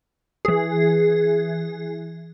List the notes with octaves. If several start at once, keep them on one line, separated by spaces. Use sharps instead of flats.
E3 G#4